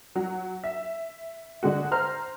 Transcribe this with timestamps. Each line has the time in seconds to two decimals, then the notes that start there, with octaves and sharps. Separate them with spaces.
0.15 F#3
0.64 E5
1.63 D3 G#3 F#4
1.91 C5 A#5 F6